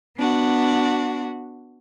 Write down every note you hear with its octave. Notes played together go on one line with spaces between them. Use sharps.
B3 D4 F#4